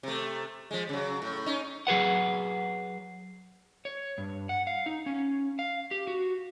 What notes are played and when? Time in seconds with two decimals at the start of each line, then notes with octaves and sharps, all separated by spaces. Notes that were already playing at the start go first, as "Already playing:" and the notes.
0.03 C3 A3
0.71 F3 G#3
0.89 C#3 F#3
1.22 A2
1.46 C#4 D#4
1.87 F#3 G#4 B4 F#5
3.85 C#5
4.18 G2
4.49 F#5
4.67 F5
4.86 D#4
5.06 C#4
5.59 F5
5.91 G4
6.07 F#4